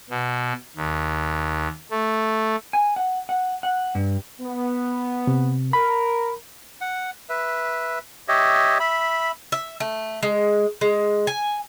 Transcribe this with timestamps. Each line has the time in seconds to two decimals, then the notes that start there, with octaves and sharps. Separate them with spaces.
0.10 B2
0.76 D#2
1.91 A3
2.73 G#5
2.96 F#5
3.29 F#5
3.63 F#5
3.95 G2
4.40 B3
5.27 C3
5.73 A#4 B5
6.81 F#5
7.29 B4 E5
8.28 G4 C#5 D#5 E5
8.80 E5 B5
9.52 E5
9.80 A3
10.23 G#3
10.81 G#3
11.27 G#5